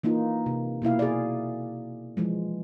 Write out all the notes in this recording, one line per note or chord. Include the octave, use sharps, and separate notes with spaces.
E3 A#3 D#4 F4
C3
B2 A#3 E4 F5
G#4 D5
E3 F3 G#3